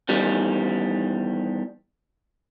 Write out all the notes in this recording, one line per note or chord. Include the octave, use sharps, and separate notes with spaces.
E2 D#3 G3